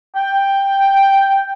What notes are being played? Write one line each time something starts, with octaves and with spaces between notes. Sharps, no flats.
G5